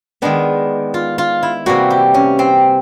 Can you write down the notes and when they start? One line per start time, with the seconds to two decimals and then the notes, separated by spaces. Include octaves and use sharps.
0.22 D#3 G#3 B3 D4
0.94 F4
1.18 F4
1.43 E4
1.66 C3 E3 G3 A#3 F#4
1.90 G4
2.14 C#4
2.39 C4